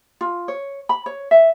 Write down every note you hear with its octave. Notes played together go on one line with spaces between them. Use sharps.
F4
C#5
B5
C#5
E5